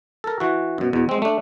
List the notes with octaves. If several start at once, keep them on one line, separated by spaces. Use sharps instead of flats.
A4 A#4
E3 F#4
F#2 B2
E2 B2
G#3 C4
A3 D4